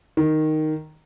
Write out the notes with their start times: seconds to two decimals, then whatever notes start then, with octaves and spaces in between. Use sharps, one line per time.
0.17 D#3